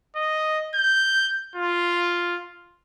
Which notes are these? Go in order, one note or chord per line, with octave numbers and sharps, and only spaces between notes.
D#5
G6
F4